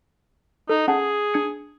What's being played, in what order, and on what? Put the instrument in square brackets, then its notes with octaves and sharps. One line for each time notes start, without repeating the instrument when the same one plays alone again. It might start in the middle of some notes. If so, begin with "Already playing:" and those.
[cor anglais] D#4 [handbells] A4
[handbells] C#4 F#5 A5 [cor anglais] G#4
[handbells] D4 G#6 C#7